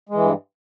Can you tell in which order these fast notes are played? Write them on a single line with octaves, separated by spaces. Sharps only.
G#3 E3 G2